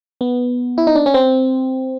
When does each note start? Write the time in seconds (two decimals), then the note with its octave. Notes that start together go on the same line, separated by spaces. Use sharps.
0.21 B3
0.78 E4
0.87 D#4
0.95 D4
1.06 C#4
1.14 C4